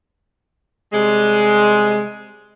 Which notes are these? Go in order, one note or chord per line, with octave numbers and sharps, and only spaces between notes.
C3 G3 G#3